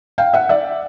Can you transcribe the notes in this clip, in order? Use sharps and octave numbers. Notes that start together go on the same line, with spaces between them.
F5 G5
E5 F#5
D5 E5